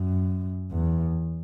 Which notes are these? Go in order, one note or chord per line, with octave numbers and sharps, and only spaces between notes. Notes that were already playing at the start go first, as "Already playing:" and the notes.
Already playing: F#2
E2